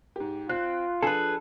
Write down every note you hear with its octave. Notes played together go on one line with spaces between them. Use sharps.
G#2 G4
C4 F4 F#6
F3 D4 G#4 A4 B4